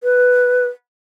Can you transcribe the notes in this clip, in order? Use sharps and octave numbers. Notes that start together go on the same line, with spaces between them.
B4